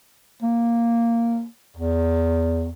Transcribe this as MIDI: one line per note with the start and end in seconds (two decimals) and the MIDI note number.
0.43 1.45 58
1.77 2.71 40